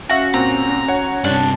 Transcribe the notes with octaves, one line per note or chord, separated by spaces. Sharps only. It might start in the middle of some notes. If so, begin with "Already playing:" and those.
C#4 F#4 E5 F5
A#2 C4 A#5
C#5 F#5
G2 C3 D4